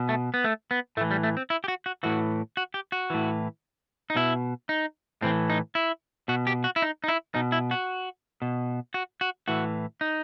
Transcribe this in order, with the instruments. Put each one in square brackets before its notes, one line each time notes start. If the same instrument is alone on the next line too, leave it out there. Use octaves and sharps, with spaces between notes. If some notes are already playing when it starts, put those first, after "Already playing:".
Already playing: [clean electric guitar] B2
A3
B3
A3
B3
A2 A3
E3
G3
A3
C4
E4
G4
F#4
F#4
A2 E3 F#4
F#4
G4
F#4
A2 E3
D#4
B2 E4
D#4
A2 E3 C4
D#4
E4
B2 F#4
G4
F#4
E4
D#4
D#4
E4
B2 D#4
E4
F#4
B2
F#4
F#4
A2 E3 F#4
D#4